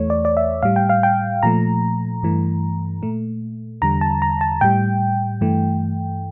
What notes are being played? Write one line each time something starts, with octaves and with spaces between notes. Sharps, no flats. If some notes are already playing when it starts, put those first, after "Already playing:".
Already playing: E2 E3 A3 C#5
D5
D5
E5
A2 G3 F5
G5
F5
G5
A#2 F3 A3 A#5
G2 E3 A3
A#2 A3
E2 D3 G3 A#5
A5
A#5
A5
A2 G3 G5
G2 E3 A3